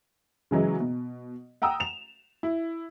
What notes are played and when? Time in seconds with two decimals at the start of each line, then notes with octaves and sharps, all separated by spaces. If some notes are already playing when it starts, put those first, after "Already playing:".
0.51 C#3 E3 F#3 G#3
0.80 B2
1.62 F#5 G5 A#5 D#6 E6
1.80 E7 F7
2.43 E4